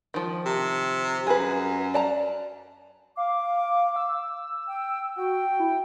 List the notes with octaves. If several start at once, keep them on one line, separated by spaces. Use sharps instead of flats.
D#3 F3
C3
F#2 G#4 B4
D5 A5 A#5
F5 D6
E6
G5
F#4 G5
E4